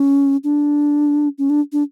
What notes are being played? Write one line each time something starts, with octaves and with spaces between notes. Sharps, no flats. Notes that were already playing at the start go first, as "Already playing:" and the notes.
Already playing: C#4
D4
C#4
D4
D4